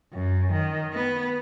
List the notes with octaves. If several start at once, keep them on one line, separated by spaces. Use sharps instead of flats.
F#2
D#3
B3